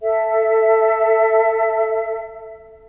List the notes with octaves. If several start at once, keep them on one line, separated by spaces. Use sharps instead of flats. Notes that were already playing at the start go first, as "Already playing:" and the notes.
A4 E5